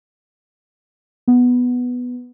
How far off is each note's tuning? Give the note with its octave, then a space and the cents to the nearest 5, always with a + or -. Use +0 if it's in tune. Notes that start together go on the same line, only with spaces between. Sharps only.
B3 +0